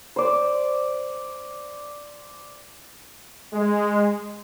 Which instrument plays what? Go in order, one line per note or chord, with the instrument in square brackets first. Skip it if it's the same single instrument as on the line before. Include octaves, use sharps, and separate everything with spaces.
[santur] C5 D5
[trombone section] G#3